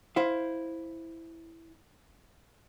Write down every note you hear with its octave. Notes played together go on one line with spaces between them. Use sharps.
E4 C5 F5